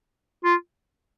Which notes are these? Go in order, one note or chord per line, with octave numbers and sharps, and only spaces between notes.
F4